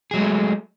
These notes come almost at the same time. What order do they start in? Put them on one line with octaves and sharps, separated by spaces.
G#4 F#3 G#3 A3